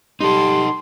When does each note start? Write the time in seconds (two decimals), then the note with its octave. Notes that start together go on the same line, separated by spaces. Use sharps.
0.21 G3 D#4 A4 C6